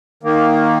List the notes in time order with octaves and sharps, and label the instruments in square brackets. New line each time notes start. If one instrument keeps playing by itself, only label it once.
[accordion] D#3 A#3